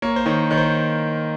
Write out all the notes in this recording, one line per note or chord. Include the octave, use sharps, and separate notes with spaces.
A#3 C#5
C5
D#3 C#5
D#3 C#5
C5